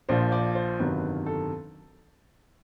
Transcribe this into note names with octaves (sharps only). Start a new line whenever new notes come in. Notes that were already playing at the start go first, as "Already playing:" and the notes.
A#1 A#2 F3 C5
D5
C5
G1 F2 C3 D#3 F#3 B4
A4